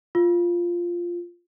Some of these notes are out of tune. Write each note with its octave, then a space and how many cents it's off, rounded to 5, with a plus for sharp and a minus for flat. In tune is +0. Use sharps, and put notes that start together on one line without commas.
F4 -5